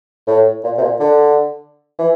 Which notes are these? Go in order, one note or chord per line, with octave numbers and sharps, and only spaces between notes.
A2
A#2
C3
A#2
D3
E3